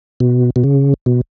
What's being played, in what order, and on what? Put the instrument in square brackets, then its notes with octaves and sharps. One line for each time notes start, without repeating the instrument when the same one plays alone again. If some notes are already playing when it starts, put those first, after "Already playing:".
[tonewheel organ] B2
B2
C#3
B2